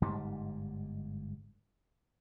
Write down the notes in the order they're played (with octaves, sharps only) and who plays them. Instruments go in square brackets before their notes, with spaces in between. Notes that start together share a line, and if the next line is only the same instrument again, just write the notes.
[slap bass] G1 G#2 G3